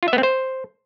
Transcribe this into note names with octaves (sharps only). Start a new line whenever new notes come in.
F4
E5
B3
C4
C5